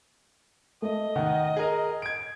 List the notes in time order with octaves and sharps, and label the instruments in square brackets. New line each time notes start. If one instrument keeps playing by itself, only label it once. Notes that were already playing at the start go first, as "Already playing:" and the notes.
[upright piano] A3 [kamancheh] D#5
[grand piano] D#3 [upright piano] F#5
[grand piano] G#4 A#4
G#6 D7